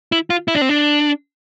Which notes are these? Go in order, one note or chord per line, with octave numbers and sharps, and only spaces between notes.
E4
F4
E4
D4
C4
D4